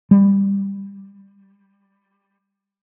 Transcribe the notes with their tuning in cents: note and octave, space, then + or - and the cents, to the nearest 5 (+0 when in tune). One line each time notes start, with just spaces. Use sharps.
G3 +15